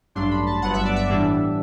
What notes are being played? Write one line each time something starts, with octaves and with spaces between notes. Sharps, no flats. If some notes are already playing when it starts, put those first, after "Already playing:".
A1 G2 F#3 A3 D4 C6
B5
A5
G1 G2 F#3 B3 F#5
E5
D5
E5
A2 E3 G3 D4